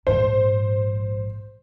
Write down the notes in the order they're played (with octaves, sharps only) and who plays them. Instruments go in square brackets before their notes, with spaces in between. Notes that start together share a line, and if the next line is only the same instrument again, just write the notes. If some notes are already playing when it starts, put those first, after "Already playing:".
[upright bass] A#1 G#2 [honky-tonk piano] C5